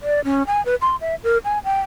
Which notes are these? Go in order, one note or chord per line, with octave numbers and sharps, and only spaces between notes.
D5
C#4
G#5
B4
C6
E5
A#4
G#5
G5